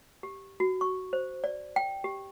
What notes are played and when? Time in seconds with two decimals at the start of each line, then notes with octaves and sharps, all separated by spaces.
0.23 G4
0.60 F#4
0.81 C#6
1.13 C5
1.44 D5
1.76 G5
2.04 G4